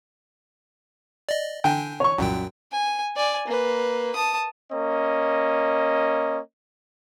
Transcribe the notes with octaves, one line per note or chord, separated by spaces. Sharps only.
D5 D#5
D3 D4 G5 G#5
C#5 C#6
C2 F#2 A#2 G5
G#5
D5 G#5
A#3 B4
A5 D#6
A#3 C#4 D#5